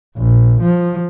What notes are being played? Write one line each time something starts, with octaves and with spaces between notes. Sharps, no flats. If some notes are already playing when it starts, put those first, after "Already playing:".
A#1
F3